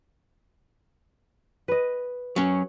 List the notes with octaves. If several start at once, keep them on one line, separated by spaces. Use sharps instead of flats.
B4 D#5
F#3 C#4